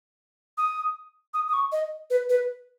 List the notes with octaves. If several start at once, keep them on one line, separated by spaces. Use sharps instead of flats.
D#6
D#6
D#6
C#6
D#5
B4
B4